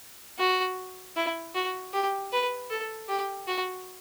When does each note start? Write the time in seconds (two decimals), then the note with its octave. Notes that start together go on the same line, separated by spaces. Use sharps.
0.39 F#4
1.15 E4
1.54 F#4
1.93 G4
2.32 B4
2.70 A4
3.08 G4
3.47 F#4